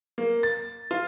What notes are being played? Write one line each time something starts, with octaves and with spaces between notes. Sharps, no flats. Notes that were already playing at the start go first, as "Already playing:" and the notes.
A#3
A6
F4